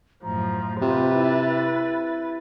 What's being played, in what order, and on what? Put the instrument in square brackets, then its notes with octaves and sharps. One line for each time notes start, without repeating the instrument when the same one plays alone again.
[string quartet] F#2 A2 F3 [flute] A#5
[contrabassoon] C3 [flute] F4 [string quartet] B4 A6
[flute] E4